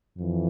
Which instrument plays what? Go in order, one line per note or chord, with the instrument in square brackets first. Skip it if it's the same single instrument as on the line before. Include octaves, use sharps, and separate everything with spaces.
[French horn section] F2 E3